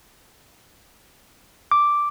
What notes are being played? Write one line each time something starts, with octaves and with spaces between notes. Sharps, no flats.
D6